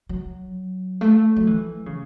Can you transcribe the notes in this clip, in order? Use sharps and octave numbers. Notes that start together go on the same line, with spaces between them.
F#3
A3
F#3
E3
C#3